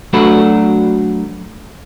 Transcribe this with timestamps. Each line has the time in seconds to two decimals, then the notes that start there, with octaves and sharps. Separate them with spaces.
0.13 F#3 A3 D4 F#4 A4 B4